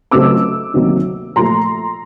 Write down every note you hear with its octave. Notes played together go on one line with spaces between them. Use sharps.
C#2 C#3 F#3 A3 C4 D6 E6
D2 C3 D#3 F#3 A#3
A#2 F3 A3 A#5 C6